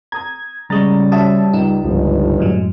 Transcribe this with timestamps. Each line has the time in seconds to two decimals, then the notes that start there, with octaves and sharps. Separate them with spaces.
0.12 A#5 D#6 G#6
0.70 C#3 G3 G#3 A#5 C#6 D#6 A6
1.12 F#4 C#5 E5 A5 D#6
1.53 C#2 D#4 E7
1.84 G1 C#2 G#2 F3
2.39 F#2 A2 F#3 G#3